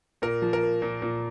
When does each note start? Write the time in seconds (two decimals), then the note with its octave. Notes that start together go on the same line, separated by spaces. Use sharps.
0.22 A#2 A#4
0.42 F3
0.53 A#4
0.63 A#3
0.82 A#2
1.02 A#2